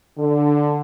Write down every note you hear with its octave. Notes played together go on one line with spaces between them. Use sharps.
D3